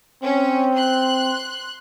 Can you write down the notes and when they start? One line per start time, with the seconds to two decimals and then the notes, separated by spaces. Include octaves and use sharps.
0.23 C4 C#4
0.75 C6 F#6